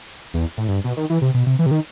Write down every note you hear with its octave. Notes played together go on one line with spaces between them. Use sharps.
E2
A2
G2
B2
D#3
E3
C3
B2
C3
E3
C3
D#3